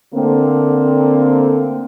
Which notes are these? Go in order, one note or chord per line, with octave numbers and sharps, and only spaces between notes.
D3 A3 A#3 C4